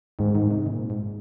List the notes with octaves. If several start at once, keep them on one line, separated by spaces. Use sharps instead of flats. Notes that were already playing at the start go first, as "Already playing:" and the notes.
G#2 D#3
D#3
C3
A#2
G#2